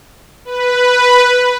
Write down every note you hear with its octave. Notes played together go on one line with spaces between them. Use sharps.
B4